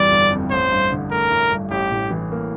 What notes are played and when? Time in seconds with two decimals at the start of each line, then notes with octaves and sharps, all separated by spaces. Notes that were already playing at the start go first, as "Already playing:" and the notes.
Already playing: G1 F2 E3 G3 D5
0.12 G1
0.32 F2
0.51 A1 C5
0.71 G2
0.92 D3
1.11 A3 A#4
1.31 A1
1.52 G2
1.71 A1 G4
1.91 A2
2.11 E3
2.31 A#3